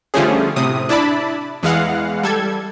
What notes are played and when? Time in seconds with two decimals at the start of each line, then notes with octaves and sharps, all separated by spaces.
0.14 D3 F3 G3 A3 C#4 G#4
0.56 A2 C3 D#6
0.89 D4 E4 D5 A5 B5
1.63 E2 E3 G#3 F5 F#5
2.23 G3 A4 G#6